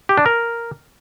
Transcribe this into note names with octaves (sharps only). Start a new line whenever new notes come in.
G4
D4
A#4